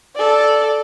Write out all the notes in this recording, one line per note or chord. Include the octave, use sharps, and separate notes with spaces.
A4 D5